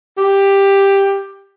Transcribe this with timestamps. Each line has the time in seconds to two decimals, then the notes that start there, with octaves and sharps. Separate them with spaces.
0.18 G4